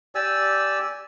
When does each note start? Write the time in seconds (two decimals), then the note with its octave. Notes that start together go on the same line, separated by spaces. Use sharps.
0.15 G4 D5 G#5 E6